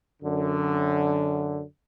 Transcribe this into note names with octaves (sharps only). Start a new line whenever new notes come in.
F#2 D3